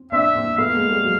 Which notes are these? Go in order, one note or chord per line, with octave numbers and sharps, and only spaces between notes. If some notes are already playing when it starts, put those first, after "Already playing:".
Already playing: C4
C4 D4 E5
A#3 C4
A3 B3 F5
G#3 A#3
G3 A3
F#3